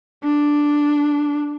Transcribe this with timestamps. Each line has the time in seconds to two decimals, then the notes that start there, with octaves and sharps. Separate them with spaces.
0.24 D4